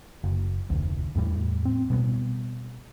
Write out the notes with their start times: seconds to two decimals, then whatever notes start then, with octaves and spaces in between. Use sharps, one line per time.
0.24 F#1
0.70 F1 D2
1.15 E2 A2 G3
1.65 C4
1.90 B2 G3 G#3 B3